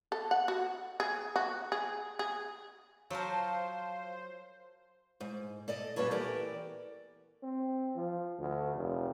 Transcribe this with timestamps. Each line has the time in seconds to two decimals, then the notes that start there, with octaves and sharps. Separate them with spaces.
0.12 A4
0.31 F#5
0.48 F#4
1.00 G#4
1.36 F#4
1.72 G#4
2.19 G#4
3.10 F3 F#3 A#4 C5 F5 A5
5.20 G#2
5.68 A4 D5 D#5
5.96 F#2 A#2 G3 B4 C#5 A5
6.11 E3 B3 G4 A4 A#4 D5
7.43 C4
7.95 F3
8.39 D2
8.75 F1